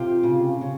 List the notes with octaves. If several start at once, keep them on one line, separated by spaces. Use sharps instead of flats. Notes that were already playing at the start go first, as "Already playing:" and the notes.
Already playing: C3 F4 G4
C#3
C#3